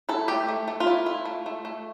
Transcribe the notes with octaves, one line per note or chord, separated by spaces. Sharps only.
E4 A4
A3 G4
A3
A3
F4
E4
E4
A3
A3
A3